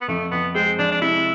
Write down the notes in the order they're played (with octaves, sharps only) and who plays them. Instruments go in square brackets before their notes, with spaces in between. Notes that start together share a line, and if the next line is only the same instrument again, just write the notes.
[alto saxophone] B3
[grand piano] F2 [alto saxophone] A3
[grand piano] F2 [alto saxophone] B3
[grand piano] G#3 [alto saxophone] C4
[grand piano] F2 [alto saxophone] D4
[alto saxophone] D4
[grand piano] C3 [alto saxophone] E4